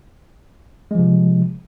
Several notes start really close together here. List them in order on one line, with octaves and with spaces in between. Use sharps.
G#3 F3 C3